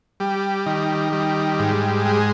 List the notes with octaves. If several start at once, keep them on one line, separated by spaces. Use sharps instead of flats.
G3
D#3
G3
G#2
G#3